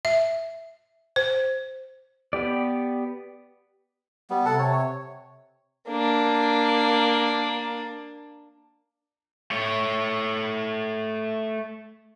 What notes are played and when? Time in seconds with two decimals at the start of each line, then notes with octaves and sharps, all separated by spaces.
0.05 E5
1.16 C5
2.33 B3 G4 D5
4.30 G3 B3
4.45 C3 A4 F#5 A5
4.59 C#5
4.73 C#5
5.89 A#3 D4
9.51 A3 C#5